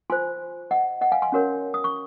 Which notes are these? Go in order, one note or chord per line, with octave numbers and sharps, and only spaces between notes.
F4 C5 G#5 C6
D#5 F#5
D#5 F#5
F5 G#5
G#5 C6
C#4 F#4 A#4 C#5
D#6
C#6